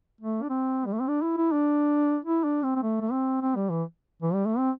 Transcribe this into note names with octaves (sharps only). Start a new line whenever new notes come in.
A3
D4
C4
G3
A3
C4
D4
E4
E4
D4
E4
D4
C4
C4
A3
A3
C4
C4
G3
E3
E3
G3
A3
C4